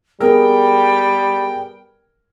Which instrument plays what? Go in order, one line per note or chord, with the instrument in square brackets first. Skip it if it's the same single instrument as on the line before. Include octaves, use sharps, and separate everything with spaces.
[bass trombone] G3 [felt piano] B3 G#4 A#4 [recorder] G5